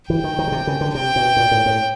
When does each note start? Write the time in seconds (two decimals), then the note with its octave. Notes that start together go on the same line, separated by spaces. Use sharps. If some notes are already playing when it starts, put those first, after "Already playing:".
0.10 E3 G5
0.24 D#3
0.39 D#3
0.48 C#3
0.52 C3
0.67 C#3
0.81 D3
0.95 C3 G5
1.16 B2
1.37 A#2
1.51 A2
1.66 A2